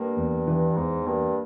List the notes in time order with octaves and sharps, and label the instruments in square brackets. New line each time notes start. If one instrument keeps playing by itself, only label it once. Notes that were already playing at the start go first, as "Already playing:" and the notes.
Already playing: [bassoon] G2 [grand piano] A#3
[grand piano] E2
E3
[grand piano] E2 [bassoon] G#2
[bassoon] G2 [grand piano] A#3